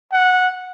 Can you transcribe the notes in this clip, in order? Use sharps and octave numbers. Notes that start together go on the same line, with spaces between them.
F#5